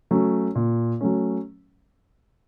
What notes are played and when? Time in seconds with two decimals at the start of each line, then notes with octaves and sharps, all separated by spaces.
0.11 F#3 A3 C#4
0.55 A#2
1.01 F#3 A3 C#4